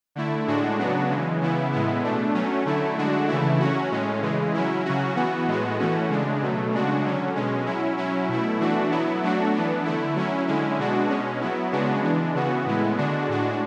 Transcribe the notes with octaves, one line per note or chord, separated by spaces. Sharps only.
D3 A3 E4
A2 G#3 D4 F#4
C#3 F#3 B3 D4 F#4
C#3 E3 G#3
C#3 E3 B3 E4
A2 G#3 B3 E4
B2 A3 D4
F#3 A3 C#4
D3 F#3 A3 E4
D3 G#3 D4 F#4
C#3 E3 A3 E4
F#3 C#4 F#4
A2 G#3 C#4
C#3 E3 G#3
F#3 C#4 E4
C#3 F#3 C#4 F#4
E3 B3 F#4
A2 G#3 B3 F#4
E3 A3 C#4 F#4
C#3 G#3 D4
B2 F#3 A3
C#3 G#3 D4 F#4
D3 F#3 C#4
B2 G#3 C#4
F#3 C#4 E4
F#3 C#4 E4
B2 A3 E4
E3 A3 D4 F#4
F#3 B3 E4
F#3 A3 D4 F#4
E3 B3 D4
D3 A3 E4
F#3 C#4 E4
D3 G#3 C#4 E4
B2 G#3 D4 F#4
B2 G#3 C#4
F#3 B3 E4
C#3 G#3 B3 D4 F#4
E3 G#3 D4
C#3 E3 B3 F#4
A2 G#3 B3 E4
D3 G#3 D4 F#4
A2 G#3 D4 F#4